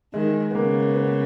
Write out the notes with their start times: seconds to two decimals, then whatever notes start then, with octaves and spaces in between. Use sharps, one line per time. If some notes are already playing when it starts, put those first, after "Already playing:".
0.14 D#3 G#3
0.50 B3
0.54 C#3 A#3
0.95 B3